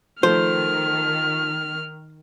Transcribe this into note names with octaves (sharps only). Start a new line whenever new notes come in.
D#3 F3 A3 C5 F6